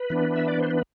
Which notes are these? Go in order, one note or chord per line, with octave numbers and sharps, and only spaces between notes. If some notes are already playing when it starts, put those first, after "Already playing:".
Already playing: B4
E3 B3 D4
E5
D5
C5
B4